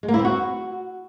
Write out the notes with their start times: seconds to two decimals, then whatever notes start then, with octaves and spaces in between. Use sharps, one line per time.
0.03 G#3
0.08 A#3
0.14 E4
0.19 C4
0.25 F#4